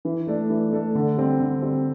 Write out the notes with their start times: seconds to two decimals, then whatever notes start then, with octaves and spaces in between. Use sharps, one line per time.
0.05 E3
0.27 A3 D4 A4
0.50 E3
0.72 A3 D4 A4
0.95 D3
1.17 G3 C4
1.40 D3
1.62 G3 C4